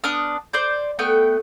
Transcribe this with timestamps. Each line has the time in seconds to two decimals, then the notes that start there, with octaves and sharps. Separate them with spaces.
0.04 B3 D4 D#6 F6
0.53 C5 D5 G6
0.99 A3 B3 G5